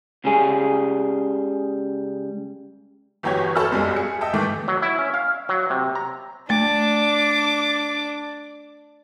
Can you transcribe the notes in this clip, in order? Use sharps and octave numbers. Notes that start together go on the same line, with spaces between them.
C#2 C#3 G3 G#4
G1 E3 F#3 G4 C#5 G#6
A4 C#5 A5 B5 E6 F6
B1 F#2 G3 G#3
G#4 C#7
D#5 E5 G5 A5
G#2 D#3 E3 A3 G5 D6
F#3
E4
C#4
F5
F#3
C3
A#5
A3 D4 D6